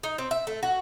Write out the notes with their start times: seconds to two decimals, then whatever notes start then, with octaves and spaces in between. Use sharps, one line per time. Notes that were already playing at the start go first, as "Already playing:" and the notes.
0.03 D#4
0.18 C4
0.31 E5
0.47 A3
0.63 F#4